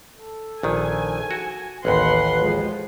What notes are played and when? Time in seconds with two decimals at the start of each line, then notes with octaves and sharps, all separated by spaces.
0.16 A4
0.63 A#1 D#3 G#5
1.31 F#4
1.85 A1 D#2 B4 F#5 C6
2.39 F3 G#3